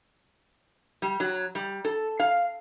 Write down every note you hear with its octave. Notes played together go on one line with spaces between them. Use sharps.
G3
F#3
G3
A4
F5